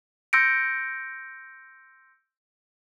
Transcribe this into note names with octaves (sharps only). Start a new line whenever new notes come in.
C6 E6 G6 A#6 C#7 D7